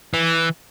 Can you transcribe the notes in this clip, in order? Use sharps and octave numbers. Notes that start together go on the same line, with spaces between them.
E3